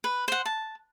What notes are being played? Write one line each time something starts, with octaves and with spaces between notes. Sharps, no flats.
B4
C5 F#5
A5